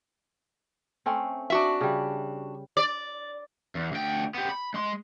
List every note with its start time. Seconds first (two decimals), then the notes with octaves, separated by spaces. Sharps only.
1.06 A3 C4 C#4
1.50 D4 F#4 E5
1.81 C#3 G3
2.77 D5
3.75 E2
3.92 D2 G5
4.34 B3 G4
4.49 B5
4.74 G#3 C6